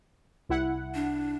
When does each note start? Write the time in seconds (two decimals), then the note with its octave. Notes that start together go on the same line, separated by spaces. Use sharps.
0.49 C2 E4 F#5
0.95 D4